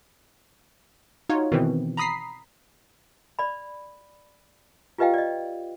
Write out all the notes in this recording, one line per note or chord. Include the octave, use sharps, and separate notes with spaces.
D#4 F4 F#4 C#5
B2 D#3 E3 C4
A#5 B5 D#6 B6 C7
D5 B5
F4 G4 B4 D#5 F5 G5
D5 D#5